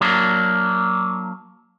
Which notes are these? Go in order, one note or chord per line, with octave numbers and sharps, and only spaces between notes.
F#3 A#3 D4